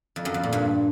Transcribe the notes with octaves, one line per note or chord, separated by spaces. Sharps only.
F2
F#2
F2
A#2
G2